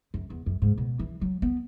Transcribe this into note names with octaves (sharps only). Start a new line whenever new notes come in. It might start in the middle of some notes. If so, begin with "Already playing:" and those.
F#2
E2
F#2
G#2
B2
E3
F#3
B3